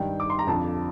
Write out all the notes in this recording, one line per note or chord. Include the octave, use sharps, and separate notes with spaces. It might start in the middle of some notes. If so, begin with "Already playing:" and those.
Already playing: G2 D#3 G3 G5
D6
C6
A#5
F2 D3 F3 A5